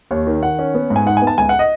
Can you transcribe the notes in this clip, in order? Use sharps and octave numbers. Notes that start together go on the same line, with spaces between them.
D#2 C#5
D#3
D#3 F#5
C#4
B3
G#2
G#5
D#4 F#5
B3 G#5
A5
C#2 G#5
F#5
D#5